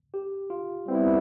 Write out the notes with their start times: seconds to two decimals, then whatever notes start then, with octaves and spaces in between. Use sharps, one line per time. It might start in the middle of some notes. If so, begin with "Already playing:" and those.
0.14 G4
0.50 F4
0.87 G3 B3 C4 E4